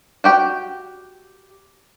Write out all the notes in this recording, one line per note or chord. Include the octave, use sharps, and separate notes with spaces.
F#4 G4 G5